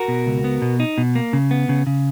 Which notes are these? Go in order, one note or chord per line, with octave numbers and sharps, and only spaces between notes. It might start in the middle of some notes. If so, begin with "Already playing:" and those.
Already playing: F#4 A#4
B2
C#2
B3
B2
D#4
B2
A#3
C#3
B3
C#3
C#3